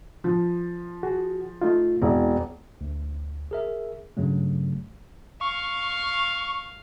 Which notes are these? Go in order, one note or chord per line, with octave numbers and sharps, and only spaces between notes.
F3
F#4 G#4
A3 D#4 F4
E1 C4 E4 D5
D2
G#4 A#4 E5
G2 C#3 F#3 A3
F5 C#6